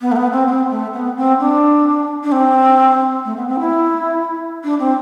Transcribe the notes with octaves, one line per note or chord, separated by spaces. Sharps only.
B3
A3
B3
C4
C4
A3
B3
C4
D4
D4
C4
A3
B3
C4
E4
D4
C4